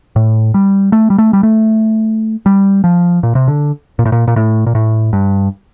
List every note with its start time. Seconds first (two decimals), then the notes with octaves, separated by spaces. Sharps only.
0.16 A2
0.54 G3
0.92 A3
1.10 G3
1.18 A3
1.33 G3
1.43 A3
2.46 G3
2.84 F3
3.23 A#2
3.35 C3
3.48 D3
3.99 A#2
4.05 A2
4.12 A#2
4.28 A#2
4.36 A2
4.67 A#2
4.75 A2
5.13 G2